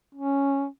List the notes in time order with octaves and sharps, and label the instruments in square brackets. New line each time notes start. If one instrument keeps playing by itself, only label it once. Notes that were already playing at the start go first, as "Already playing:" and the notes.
[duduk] C#4